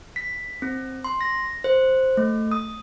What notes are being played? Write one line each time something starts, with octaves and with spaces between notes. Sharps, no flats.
B6
C4
C6
A#6
C5
A3
D#6